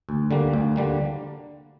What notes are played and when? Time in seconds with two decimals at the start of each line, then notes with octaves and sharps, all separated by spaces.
0.09 D2
0.31 D3 G3 A#3
0.53 D2
0.76 D3 G3 A#3